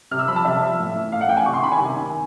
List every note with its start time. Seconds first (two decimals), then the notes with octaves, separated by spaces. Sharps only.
0.11 C3 F6
0.19 E6
0.28 F3 B5
0.36 A5
0.45 C3 E5
0.61 F3
0.79 A2
0.96 E3
1.12 A2 F5
1.21 F#5
1.29 E3 G5
1.37 G#5
1.46 C3 C#6
1.54 C6
1.62 D#3 B5
1.72 G#5
1.79 C3
1.96 D#3